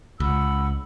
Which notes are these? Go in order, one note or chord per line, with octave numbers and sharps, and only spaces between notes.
C#2 F#5 B5 E6